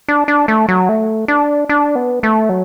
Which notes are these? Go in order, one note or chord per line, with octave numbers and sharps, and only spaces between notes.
D4
D4
A3
F#3
A3
D4
D4
B3
A3
F#3